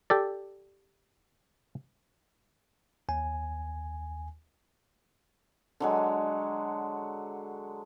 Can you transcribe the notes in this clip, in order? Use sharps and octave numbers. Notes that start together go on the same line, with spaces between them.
G4 A4 D5
D#2 G#5
D3 F#3 G#3